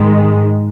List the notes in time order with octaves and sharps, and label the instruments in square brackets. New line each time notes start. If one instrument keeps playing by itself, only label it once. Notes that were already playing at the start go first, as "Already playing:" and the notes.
Already playing: [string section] G#2 D#3 G#3